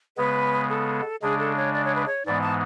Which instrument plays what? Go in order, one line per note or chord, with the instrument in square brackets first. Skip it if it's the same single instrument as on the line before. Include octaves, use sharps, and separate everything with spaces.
[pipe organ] C#3 G#3 B3 [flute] B4
[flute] A4
[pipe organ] C#3 G#3 D4 [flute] G#4
[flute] A4
C#5
D5
C#5
B4
C#5
[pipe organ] G#2 E3 G#3 B3 [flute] D5
[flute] A5